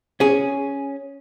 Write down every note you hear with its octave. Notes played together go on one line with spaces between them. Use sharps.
C#4 G#4